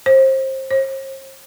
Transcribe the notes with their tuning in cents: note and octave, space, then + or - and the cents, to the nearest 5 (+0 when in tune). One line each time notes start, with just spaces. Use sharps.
C5 +25
C5 +45